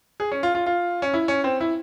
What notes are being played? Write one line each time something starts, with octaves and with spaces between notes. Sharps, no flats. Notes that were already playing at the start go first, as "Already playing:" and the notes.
G#4
C#4
F4
F4
F4
C#4
E4
C#4
C4
E4